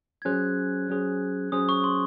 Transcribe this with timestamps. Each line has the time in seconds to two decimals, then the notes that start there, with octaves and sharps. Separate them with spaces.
0.22 G#6
0.25 F#3 C#4 G#4 C5 F#6
0.89 F#3 C#4 G#4 C5
1.52 F#3 C#4 G#4 C5 D#6
1.69 C#6
1.84 C6